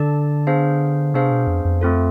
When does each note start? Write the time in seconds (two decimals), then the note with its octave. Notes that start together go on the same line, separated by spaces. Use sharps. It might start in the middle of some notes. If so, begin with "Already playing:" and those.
Already playing: D3 D4 A4 D5 A5
0.47 B3 D4 G#4 C5 F5
1.14 C3 B3 D4 G#4 C5 F5
1.31 B2
1.47 F2
1.65 F2
1.81 A3 C4 F4 A4